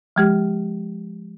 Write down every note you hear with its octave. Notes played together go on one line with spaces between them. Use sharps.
F3 G#3 G4